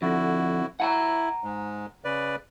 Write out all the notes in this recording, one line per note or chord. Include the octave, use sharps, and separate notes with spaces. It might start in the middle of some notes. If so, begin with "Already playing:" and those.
F2 D3 E4 F#4
E4 F#5 A5 A#5
G#2 G#3
C#3 B4 D5